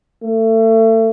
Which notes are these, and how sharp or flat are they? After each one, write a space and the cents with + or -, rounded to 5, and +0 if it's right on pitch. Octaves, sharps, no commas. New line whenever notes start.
A3 +30